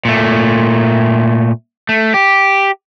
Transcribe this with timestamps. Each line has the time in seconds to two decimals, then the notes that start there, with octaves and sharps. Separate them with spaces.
0.05 A#2 A3
1.89 A3
2.14 G4